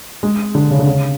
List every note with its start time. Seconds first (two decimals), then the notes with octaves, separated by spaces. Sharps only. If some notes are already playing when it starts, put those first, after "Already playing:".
0.23 G#3
0.55 D3
0.71 C#3
0.79 D3
0.86 C#3